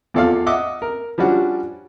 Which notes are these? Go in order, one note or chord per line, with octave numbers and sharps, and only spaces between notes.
E2 F3 A4 D5 F5
D#5 E5 F#5 D6
A#4
F3 G3 C#4 D4 F#4